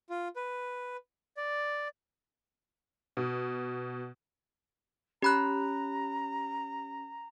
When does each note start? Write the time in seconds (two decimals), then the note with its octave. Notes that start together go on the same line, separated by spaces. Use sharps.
0.10 F4
0.36 B4
1.37 D5
3.17 B2
5.22 C#4 G4 A#5 B5 F#6